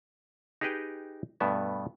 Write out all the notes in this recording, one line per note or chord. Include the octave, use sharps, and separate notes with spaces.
D#4 G4 G#4 B4 D#5 G5
G2 B2 A3 B3 E5